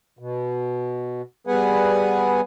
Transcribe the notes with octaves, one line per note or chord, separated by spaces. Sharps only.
B2
G3 B3 G#4 B4 F#5 G#5